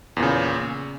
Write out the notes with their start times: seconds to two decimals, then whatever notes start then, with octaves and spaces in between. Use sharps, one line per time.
0.17 E2
0.20 A#2
0.23 C#3